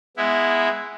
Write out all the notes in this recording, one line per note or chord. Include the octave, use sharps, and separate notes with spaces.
G#3 B3 E4